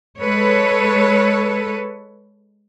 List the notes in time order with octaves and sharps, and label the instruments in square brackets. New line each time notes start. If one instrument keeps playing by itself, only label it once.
[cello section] G#3 A4 B4 C#5